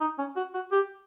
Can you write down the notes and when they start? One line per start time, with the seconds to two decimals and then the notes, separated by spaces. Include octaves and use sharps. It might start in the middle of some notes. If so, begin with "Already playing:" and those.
0.01 D#4
0.18 C#4
0.36 F#4
0.54 F#4
0.72 G4